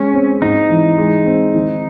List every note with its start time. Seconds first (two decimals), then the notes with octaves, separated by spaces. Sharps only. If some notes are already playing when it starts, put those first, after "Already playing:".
Already playing: G#3 C#4
0.14 C4
0.42 G#2 D#4
0.70 E3
0.98 G#3
1.26 C4
1.55 D#3